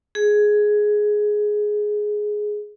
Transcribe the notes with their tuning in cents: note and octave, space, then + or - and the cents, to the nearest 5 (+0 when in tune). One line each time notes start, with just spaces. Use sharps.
G#4 +10